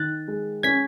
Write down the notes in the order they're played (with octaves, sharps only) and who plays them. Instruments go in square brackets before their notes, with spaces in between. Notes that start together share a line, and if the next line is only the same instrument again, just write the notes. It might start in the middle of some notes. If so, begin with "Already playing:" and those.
Already playing: [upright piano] D#3 [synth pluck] F#6 A6
[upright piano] G#3
[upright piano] C#4 [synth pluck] G#6 B6